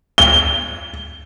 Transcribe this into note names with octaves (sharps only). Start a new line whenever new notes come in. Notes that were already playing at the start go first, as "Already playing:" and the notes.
G7